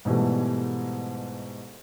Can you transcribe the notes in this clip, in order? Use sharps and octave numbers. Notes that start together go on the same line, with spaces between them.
G#2 B2 E3 G3 A3